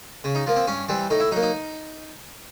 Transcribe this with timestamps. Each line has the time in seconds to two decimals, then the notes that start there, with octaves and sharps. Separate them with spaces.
0.24 C#3
0.35 D#4
0.46 F3 A#3
0.56 C4
0.67 G2 C#4
0.89 E3 G3 C4
1.10 A2 D#4
1.20 E4
1.31 F#3 D#4
1.36 A#3
1.43 D#4